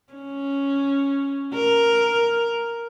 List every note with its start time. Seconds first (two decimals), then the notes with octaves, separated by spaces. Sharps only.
0.14 C#4
1.54 A#4